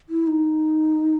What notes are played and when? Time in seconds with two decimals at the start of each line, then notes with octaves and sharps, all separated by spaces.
0.09 E4
0.27 D#4